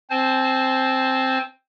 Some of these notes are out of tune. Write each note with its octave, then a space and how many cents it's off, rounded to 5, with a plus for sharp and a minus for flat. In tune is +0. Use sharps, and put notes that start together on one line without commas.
C4 +5 C5 +0 A5 -40